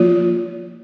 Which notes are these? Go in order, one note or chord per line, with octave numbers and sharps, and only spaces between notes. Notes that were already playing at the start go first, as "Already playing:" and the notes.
Already playing: F3 A#3 F4